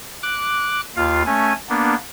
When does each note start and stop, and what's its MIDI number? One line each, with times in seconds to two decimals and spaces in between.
0.23 0.81 86
0.23 0.81 90
0.96 1.23 39
0.96 1.23 65
0.96 1.23 77
1.26 1.53 57
1.26 1.53 61
1.26 1.53 80
1.69 1.95 58
1.69 1.95 59
1.69 1.95 62